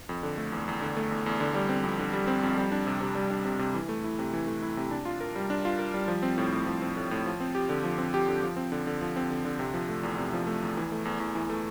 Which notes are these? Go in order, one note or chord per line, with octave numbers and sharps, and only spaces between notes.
F2
D3
A3
E2
E2
D3
A3
E2
E2
D3
G3
C4
F2
D3
G3
C4
F2
G3
D4
C3
C3
G3
D4
C3
C3
E3
A3
E4
C3
E3
A3
E4
C3
D4
F4
A#4
G3
D4
F4
A#4
G3
F3
C4
A2
A2
F3
C4
A2
A2
F3
C4
G4
D3
F3
C4
G4
D3
F3
C4
D3
D3
F3
C4
D3
D3
C3
F3
A3
E2
C3
F3
A3
E2
E3
A3
E2
E2
E3
A3